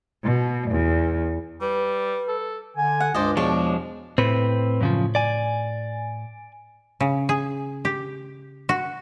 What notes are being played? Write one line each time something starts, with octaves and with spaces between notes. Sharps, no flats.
B2
E2
G3 B4
A4
D3 G#5
F#5
C#2 G2 G#3 C5 D5 D#5
E2 B2 F3 G#3 D4 C#5 D5
A2 C4 B4
F#2 C#3 F3
D5 G#5
C#3
G#4
G4
F#4